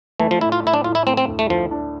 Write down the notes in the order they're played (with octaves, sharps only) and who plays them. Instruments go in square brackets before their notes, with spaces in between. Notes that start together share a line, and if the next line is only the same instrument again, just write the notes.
[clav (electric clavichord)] E3 [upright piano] A3
[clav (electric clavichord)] F3
[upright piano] A2 [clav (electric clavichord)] E4
[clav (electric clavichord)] F4
[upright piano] A2 [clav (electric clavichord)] E4
[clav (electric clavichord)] D4
[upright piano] A2 [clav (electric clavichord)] F4
[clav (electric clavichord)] E4
[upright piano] A3 [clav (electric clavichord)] C4
[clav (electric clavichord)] C4
[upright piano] D2
[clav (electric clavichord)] A3
[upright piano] D2 [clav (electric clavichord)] F3
[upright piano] D4